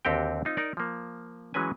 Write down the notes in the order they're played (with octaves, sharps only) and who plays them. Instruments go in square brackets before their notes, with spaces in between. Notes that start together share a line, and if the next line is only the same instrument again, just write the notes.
[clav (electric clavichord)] D#2 D3 C4 F#4 G4 G5
C4 D#4 F4
D#4 A#4 D5
F3 A#3
E3 F#3 G#3 C#4 B4 G#5